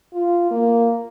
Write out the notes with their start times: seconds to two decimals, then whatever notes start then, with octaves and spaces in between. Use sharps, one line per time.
0.14 F4
0.51 A#3